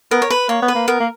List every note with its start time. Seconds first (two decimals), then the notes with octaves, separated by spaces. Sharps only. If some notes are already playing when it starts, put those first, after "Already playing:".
0.11 B3 A#4
0.22 C#5
0.30 B4
0.49 A#3 C#5
0.62 B3
0.68 B4
0.75 A#3
0.88 B3 A#4
1.00 A#3